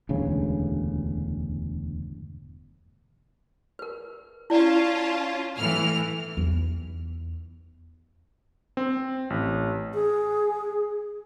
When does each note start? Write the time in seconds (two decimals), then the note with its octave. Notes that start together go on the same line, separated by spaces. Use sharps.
0.09 E1 D2 G2 C#3
3.79 A#4 B4
4.50 C#4 E4 F4 D5 A5
5.58 A2 E3 F6
6.37 E2 D#4
8.77 C4
9.30 A1
9.94 G#4